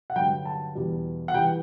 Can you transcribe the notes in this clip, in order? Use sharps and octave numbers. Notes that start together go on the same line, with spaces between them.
F#5
G2 D3 F#3 G5
A5
E2 B2 G3
F#5
E3 G3 G5